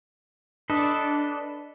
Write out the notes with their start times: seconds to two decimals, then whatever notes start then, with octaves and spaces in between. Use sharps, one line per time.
0.70 D4 A4 B4 D#5